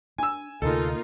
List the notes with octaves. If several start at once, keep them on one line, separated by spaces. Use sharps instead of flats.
D4 G#5 E6
D2 C3 A#3 D#4 F4 A4